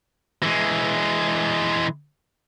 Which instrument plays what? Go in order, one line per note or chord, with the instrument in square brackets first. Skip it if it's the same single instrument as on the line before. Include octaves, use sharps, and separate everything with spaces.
[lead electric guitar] E3 G#3